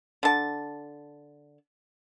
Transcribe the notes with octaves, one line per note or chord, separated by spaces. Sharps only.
D3 A5